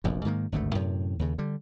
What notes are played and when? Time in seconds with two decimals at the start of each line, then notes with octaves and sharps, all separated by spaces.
0.04 F1 A#1 F#2
0.25 G#2 D#3 A#3
0.52 G#1 D2 G2 A3
0.75 F#2 A2 C3
1.19 D#2 C#3
1.38 D3 G3